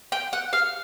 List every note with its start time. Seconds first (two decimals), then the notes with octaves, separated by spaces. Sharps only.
0.12 G5
0.33 F#5
0.53 F5